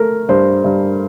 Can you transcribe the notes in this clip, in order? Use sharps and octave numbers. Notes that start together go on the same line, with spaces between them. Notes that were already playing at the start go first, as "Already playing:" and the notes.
Already playing: A3 A#4
G2 C5
G2